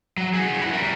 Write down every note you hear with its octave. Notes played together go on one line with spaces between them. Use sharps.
F#3
F#4 G#4
E4 F#5
G3 A#4